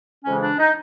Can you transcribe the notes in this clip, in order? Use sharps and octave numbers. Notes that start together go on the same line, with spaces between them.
F2 C#3 E3 G#3 C#4
D4
D#4